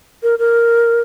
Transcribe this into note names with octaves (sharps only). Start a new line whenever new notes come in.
A#4
A#4